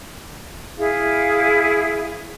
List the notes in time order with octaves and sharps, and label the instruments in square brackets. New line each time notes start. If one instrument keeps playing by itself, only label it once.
[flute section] E4 G#4 F5